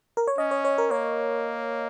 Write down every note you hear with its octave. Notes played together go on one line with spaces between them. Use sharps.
A#4
C#5
C#4 D#5
C#5
C#5
A#4
A#3 C#5